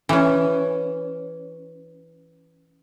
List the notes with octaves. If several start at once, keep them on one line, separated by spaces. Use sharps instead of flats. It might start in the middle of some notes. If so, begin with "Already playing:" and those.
E3 C#4